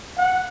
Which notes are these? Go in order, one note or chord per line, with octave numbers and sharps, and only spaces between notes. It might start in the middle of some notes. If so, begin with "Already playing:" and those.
F#5